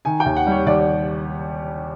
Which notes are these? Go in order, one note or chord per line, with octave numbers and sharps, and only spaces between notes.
D#3 G#5
G5
D#2
F#5
G3 C#5
D#2 D5
D5